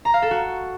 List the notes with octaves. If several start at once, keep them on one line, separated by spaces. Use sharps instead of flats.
A#5
F5
A4
F#4